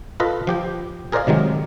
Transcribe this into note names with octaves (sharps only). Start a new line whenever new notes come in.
F4 A4 B4 D#5
F3 G4 G5
G#4 A#4 C5 D5 D#5 F5
C3 D#3 F#3 G#3